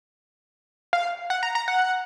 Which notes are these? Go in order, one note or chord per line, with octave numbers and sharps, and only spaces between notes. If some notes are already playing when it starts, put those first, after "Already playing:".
F5
F#5
A#5
A#5
F#5